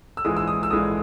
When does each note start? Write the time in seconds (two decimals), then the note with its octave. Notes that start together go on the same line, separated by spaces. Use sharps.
0.17 E6
0.25 A#1 G#2 E3 G#3 D#6
0.37 E6
0.48 D#6
0.63 E6
0.70 A#1 G#2 E3 G#3 D#6